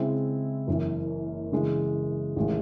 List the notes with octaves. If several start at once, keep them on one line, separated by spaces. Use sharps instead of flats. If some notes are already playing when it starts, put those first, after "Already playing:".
Already playing: C#3 G#3 C4 E4 G#4
F#1 F#2 E3
C#3 E3 G#3
A1 D#3 G#3